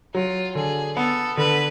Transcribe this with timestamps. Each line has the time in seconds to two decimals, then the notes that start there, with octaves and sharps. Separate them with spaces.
0.14 F#3 F4
0.55 D3 G#4
0.97 B3 A4
1.37 D3 B4